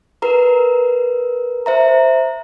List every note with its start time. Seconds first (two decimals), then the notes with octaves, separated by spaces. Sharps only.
0.22 A#4 B4 A#5
1.66 C5 E5 A#5